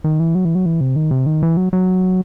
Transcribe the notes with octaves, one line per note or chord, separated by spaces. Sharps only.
D#3
E3
F#3
E3
F#3
E3
C3
D#3
C3
D#3
E3
F#3
F#3